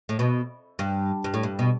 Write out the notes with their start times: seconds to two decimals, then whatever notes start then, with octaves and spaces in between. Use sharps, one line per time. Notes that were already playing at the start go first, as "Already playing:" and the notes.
0.09 A2
0.19 B2
0.79 G2
1.24 G2
1.34 A2
1.43 G2
1.59 B2